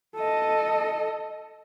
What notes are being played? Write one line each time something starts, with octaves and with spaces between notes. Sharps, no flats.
A4 D#5